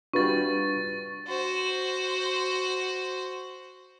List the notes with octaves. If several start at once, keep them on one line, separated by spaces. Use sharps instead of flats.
G3 D4 F4 F#4 B4 C#6 A6
F#4 C5